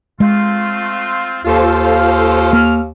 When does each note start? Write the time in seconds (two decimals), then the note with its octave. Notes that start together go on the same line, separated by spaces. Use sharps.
0.20 G#3 A3 C4 F4
1.44 D#2 F4 A4 C5 F5
2.53 A#3 F6